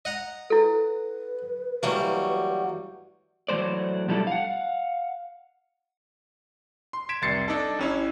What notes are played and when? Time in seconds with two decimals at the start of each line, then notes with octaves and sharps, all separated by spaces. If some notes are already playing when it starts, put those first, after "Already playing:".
0.05 D#5 F#5 A#5
0.50 E4 A4 B4
1.83 E3 F#3 G3 A3 A#3 F#4
3.49 A2 E3 F#3 G#3 C5 D5
4.08 B2 F3 G3 D4 E4 A4
4.27 F5 F#5
6.93 C6
7.09 G#6 B6 D7 E7
7.22 F1 C2 C6 A6 C7 C#7
7.48 D4 D#4 A4
7.79 A1 C#4 E4